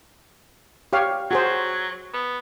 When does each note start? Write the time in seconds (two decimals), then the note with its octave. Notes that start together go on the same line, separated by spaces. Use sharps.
0.93 G4 C#5 F5
1.31 F#3 F#4 G#4 C5
2.14 B3